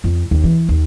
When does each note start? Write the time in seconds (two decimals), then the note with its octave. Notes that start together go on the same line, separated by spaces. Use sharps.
0.04 F2
0.31 D#2
0.44 E3
0.69 D#2